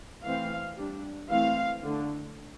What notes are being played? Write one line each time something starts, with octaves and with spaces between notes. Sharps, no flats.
E3 A3 C4 F5
G3 D4
E3 A3 C4 F5
D3 A3 D4